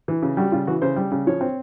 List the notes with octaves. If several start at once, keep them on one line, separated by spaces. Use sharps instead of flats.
E3
C#3
G3 F#4
C#3 F4
E3 F#4
C#3 C5
G3
C#3
F3 C#5
C4